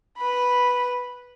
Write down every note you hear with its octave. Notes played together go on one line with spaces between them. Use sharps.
B4 B5